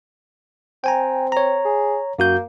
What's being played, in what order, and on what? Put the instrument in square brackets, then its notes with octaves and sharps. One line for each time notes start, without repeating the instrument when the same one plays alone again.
[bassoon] C4 [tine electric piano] G5 G#5 A#5
[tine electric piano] C#5 A#5
[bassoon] G#4
[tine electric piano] F#2 F#4 G6 [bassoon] A#3